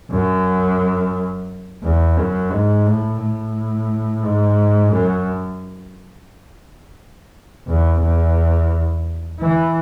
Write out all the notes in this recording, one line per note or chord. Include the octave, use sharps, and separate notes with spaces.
F#2
E2
F#2
G#2
A2
A2
G#2
F#2
E2
E2
E3